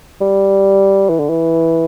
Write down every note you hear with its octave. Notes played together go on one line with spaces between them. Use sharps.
G3
E3
D3
E3